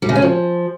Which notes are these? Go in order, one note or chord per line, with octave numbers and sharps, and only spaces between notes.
G3
C#3
C#4
F3